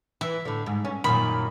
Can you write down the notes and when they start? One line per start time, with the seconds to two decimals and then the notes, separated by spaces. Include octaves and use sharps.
0.21 E3 E5
0.45 A2 D3
0.66 G#2
0.85 C#4
1.04 F#2 A#2 D#3 B5